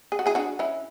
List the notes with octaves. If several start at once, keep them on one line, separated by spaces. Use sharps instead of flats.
G#4
F#4
E4 G#4
D4 F#4
C#4 E4